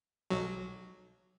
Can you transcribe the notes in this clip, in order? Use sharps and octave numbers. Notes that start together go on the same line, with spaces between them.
B1 F#3